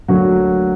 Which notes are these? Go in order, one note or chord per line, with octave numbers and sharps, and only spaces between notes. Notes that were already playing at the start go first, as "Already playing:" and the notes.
D2 D3 F#3 A#3 F#4